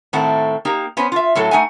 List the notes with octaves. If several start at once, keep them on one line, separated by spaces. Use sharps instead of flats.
A2 D#3 A3 C4 F#5
A#3 D#4 G4
B3 C#4 B4 C5
F4 E5
A2 F#3 A4
A3 D#4 F#5 G#5